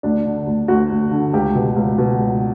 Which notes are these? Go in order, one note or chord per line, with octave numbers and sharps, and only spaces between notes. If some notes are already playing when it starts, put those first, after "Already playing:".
D2 D4
D3
D2
D2 F#4
D2
D3
C#2 G4
B2
C#2
B2
C#2